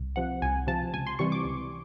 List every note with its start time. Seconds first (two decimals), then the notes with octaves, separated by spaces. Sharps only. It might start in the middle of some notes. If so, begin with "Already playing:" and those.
Already playing: C2
0.16 C3 F3 F#5
0.42 C2 G#5
0.67 C3 F3 A5
0.94 C#2 G#5
1.07 C6
1.19 C3 E3 G3 C#6
1.32 D6
1.45 C#2